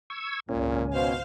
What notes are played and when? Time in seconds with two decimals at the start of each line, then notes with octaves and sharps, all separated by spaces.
0.10 C#6 E6 G#6
0.49 G#1 C#2 A#2 C#4
0.94 B2 C5 F5